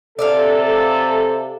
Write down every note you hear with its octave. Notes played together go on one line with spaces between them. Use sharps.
C3 A4 D5 E5 F5